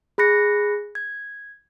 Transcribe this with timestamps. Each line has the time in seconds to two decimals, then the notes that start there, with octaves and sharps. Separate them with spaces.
0.18 G#4 B5 F#6 A#6 C#7
0.95 G#6